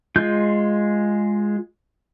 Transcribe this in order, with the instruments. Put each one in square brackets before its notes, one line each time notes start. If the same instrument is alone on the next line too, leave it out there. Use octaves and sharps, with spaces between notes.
[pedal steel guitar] G#3 F4 G6